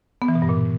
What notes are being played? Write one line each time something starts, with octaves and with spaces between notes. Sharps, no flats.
B3
E3
B2
G2
A#2